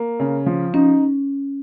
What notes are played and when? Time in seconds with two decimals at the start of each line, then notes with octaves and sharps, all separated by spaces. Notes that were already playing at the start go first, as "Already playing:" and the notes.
Already playing: A#3
0.20 C#3
0.46 F3
0.74 C#4 D#4